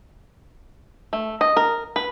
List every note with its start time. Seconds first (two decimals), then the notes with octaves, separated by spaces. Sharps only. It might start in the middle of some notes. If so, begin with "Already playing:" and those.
1.13 A3
1.41 D#5
1.57 A#4
1.96 B4